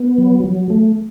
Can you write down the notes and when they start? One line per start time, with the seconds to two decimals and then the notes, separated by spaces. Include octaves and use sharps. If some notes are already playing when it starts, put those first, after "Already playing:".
Already playing: B3
0.18 F#3
0.44 F#3
0.70 A3